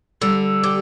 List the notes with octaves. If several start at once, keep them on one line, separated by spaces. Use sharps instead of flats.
D3 G3
G4